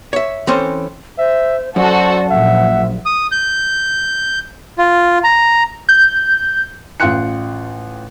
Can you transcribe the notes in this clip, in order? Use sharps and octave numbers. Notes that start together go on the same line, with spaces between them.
C#5 E5
E3 C4 C#4 A4 C5
C5 E5
F#2 F#4 A4 C5 D5
A#1 E5 F#5
D#6
G6
F4
A#5
G6
A1 F4 G5 C6 F#6 C#7